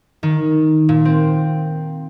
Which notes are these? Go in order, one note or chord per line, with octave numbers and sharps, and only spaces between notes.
D#3
A#2
C4